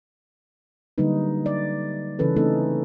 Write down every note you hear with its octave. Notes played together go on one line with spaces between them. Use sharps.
D3 F#3 G3 A#3 D#4 B4
D5
C#3 E3 C#4 A4 B4
A3 C4 C#4 D#4 A4